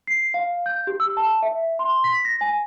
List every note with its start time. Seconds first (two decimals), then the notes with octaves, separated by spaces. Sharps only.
0.07 C7
0.34 F5
0.66 G6
0.87 G4
1.00 E6
1.17 A5
1.42 E5
1.79 C6
2.04 B6
2.25 A#6
2.41 G#5